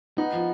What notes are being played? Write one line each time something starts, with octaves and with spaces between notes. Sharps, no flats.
B3 D#4
F3